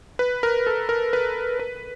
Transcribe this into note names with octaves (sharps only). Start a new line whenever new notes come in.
B4
A#4
A4
A#4
B4
B4